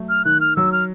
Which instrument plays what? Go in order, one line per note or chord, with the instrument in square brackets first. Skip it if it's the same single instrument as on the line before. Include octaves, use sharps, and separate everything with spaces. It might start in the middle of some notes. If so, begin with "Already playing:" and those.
Already playing: [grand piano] F#3 A3
[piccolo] F6
[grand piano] D#3 [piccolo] F#6
[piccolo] F6
[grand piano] F#3 [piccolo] E6
[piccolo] F6